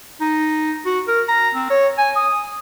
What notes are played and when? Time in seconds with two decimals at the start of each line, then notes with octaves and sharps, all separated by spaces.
0.21 D#4
0.86 F#4
1.08 A#4
1.29 A#5
1.55 C4
1.70 C#5
1.98 G#5
2.16 D#6